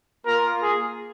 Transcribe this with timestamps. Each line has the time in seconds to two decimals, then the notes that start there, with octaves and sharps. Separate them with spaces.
0.24 A#3 F4 A#4
0.62 G#4